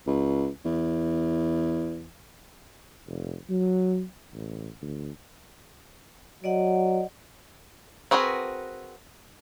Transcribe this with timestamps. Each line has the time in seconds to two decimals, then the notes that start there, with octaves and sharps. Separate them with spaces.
0.07 C#2
0.65 E2
3.08 F1
3.50 F#3
4.33 A1
4.82 D2
6.44 F#3 D5 D#5 F#5
8.11 C4 F#4 G#4 A#4 B4